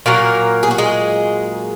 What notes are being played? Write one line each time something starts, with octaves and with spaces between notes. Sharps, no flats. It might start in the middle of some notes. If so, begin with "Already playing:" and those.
A#2 F#3 A#3 A#4
G#4
F#4
G#3 G#4